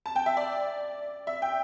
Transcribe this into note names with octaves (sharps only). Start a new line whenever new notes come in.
A5
G5
E5
D5
E5
G5